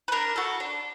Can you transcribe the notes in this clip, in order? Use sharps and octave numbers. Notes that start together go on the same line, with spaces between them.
B4
D4 A#4
F#4 A4
D4